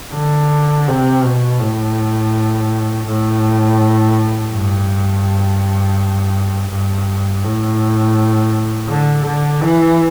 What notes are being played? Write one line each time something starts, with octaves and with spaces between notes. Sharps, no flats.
D3
C3
B2
A2
A2
G2
G2
A2
D3
D3
E3